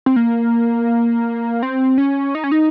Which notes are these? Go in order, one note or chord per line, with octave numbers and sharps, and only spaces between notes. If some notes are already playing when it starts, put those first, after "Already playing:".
C4
A#3
C4
C#4
D#4
C#4
D#4